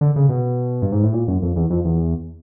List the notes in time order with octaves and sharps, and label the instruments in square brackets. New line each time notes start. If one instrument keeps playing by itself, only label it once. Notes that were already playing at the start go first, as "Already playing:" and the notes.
[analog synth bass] D3
C#3
B2
G2
G#2
A2
A#2
F#2
F2
E2
F2
E2